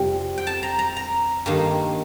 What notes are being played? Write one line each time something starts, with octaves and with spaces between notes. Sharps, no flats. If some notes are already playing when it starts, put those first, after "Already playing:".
Already playing: F2 C3 G3 C4
G5
A5
A#5
A#5
A#5
G2 D#3 A#3